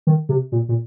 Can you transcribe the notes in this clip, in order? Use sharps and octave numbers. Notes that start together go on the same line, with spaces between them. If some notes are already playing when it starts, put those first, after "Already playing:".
D#3
C3
A#2
A#2